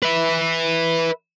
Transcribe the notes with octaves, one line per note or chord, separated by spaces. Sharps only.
B4 E5